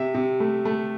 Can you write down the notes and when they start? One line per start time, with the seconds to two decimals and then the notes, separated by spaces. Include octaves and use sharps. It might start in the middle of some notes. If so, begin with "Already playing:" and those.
Already playing: C3 E5
0.14 C3
0.40 A3
0.65 A3